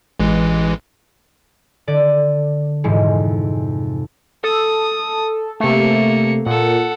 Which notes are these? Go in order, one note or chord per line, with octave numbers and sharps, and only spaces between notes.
A1 E3 G#3
D3 D5 D#7
F2 G#2 C3 E3 G#3
A4 D#6
C3 A3 A#3 C#7
A#2 A4 F#5